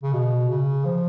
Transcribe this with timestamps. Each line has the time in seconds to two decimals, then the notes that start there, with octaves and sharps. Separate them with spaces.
0.03 C#3
0.13 B2
0.49 C#3
0.85 F3